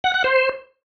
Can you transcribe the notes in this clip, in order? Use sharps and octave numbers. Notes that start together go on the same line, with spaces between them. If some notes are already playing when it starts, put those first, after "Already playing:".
F#5
F#5
C5